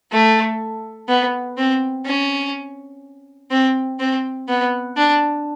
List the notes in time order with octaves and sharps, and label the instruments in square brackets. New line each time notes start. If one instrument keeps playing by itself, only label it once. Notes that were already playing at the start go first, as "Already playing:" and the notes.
[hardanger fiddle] A3
B3
C4
C#4
C4
C4
B3
D4